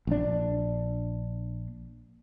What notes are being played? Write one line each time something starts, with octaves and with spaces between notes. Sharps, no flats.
A#1 D4